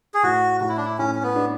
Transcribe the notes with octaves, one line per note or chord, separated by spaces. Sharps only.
G#4
A2 F#4
A2 F#4
E4
D4
E4
A2 C#4
C#4
B3
D4